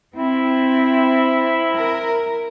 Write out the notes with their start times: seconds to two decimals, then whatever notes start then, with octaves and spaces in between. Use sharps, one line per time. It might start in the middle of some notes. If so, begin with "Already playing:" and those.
0.16 C4 E4
1.76 A#4